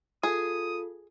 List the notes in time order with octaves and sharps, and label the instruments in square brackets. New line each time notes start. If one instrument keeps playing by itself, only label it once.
[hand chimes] F4 A4 [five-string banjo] G#4 [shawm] D#6